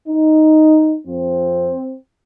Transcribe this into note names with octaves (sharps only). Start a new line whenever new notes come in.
D#4
F2 F3 C4